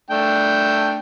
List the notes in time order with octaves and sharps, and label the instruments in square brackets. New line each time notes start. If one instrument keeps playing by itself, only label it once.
[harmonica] A3 D4 G5